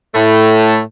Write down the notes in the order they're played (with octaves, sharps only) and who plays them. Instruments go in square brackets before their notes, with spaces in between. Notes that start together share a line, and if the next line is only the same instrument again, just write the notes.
[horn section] A2 A3